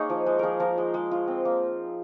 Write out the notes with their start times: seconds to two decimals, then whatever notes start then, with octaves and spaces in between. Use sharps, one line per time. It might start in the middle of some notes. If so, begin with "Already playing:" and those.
Already playing: A#3 D#4 G#4 C#5 D#5
0.10 F3
0.26 G#3
0.39 F3 G#4 A#4
0.60 F3 A#4
0.78 G#3
0.94 G#3
1.11 F4
1.28 C4
1.45 A#3